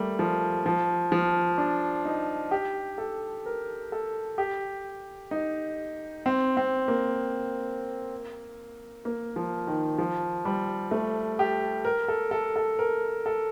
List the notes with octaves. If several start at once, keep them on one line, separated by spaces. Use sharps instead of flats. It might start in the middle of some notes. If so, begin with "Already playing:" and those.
Already playing: G3 A3 A#3
F3
F3
F3
D4
D#4
G4
A4
A#4
A4
G4
D#4
C4
C4
A#3
A#3
F3
D#3
F3
G3
A3
G4
A#4
A4
A4
A4
A#4
A4